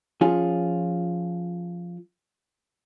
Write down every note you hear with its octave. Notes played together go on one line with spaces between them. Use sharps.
F3 C#4 F4 G#4